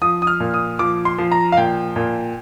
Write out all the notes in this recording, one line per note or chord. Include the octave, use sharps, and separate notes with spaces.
F3 D#6
D#6
F6
A#2
D#6
F3 D6
C6
F3
A#5
F5
A#2 G5
A#2